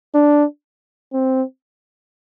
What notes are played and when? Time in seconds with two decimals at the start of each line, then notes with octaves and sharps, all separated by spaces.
0.15 D4
1.13 C4